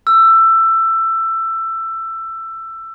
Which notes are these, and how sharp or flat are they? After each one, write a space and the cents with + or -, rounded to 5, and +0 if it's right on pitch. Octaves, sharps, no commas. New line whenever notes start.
E6 +15